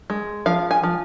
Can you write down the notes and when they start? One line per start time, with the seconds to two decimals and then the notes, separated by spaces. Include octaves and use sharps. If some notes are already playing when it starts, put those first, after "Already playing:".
0.10 G#3
0.46 F3 F5
0.71 G#5
0.83 F3